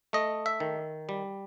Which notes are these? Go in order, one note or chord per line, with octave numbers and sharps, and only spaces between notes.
A3 D#5
E5
D#3
G3